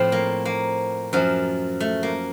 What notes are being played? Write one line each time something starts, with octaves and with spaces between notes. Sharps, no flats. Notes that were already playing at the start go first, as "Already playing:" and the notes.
Already playing: A2 F3 C4
A#3
A#3
F#2 F3
A3
A#3